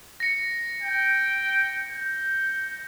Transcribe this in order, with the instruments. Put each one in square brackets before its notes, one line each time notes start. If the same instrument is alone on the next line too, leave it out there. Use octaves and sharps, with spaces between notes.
[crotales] A#6 C#7
[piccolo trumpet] G5
G6